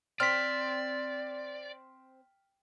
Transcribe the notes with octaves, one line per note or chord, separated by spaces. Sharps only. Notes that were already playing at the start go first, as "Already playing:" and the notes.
C4 D5 F6 B6